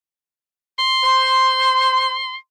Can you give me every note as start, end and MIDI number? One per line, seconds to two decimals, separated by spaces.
0.79 2.36 84
1.04 2.16 72